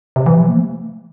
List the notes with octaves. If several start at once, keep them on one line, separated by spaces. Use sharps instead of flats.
C3
E3
F3
A#3
A3